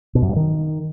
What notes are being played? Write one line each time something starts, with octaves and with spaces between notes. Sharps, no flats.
B2
F#2
G2
D#3